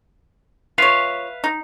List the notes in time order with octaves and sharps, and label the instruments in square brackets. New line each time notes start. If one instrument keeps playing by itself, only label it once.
[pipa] F4 C#5 [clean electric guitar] B4 E5 F5
[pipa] D#4